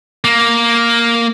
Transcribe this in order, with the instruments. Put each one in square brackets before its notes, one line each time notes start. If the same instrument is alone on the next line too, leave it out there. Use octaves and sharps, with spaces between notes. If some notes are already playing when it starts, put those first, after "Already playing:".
[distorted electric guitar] A#3